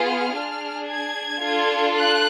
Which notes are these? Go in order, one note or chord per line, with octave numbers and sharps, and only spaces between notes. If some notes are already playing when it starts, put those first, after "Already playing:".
Already playing: B3 F4 G#4 F6
D4 G#4
G#6
D4 F4 A4
F#6